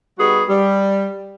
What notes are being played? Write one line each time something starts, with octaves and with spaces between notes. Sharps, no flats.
G3 B3 D#4 F#4 G#4
G3